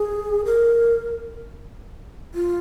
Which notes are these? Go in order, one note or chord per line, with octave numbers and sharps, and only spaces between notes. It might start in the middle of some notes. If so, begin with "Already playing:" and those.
Already playing: G#4
A#4
F4